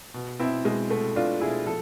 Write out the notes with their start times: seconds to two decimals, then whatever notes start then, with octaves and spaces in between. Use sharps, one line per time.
0.14 B2
0.39 B2 C4 E4
0.64 B2 G#3
0.91 B2 A3
1.16 B2 D4 F4
1.41 B2 E4 G#4
1.66 F3 A4